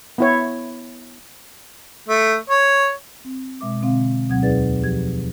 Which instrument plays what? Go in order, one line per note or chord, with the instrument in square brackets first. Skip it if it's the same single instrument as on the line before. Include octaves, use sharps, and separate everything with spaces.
[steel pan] B3 E4 C#5
[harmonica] A3
C#5
[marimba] C4
B2 G#3 E5 D6
B2 D3 C4 F5
D2 B2 F#3 C4 F#5 G#6
E2 D#4 G#4 B4 D5 A6
F3 G4 G#6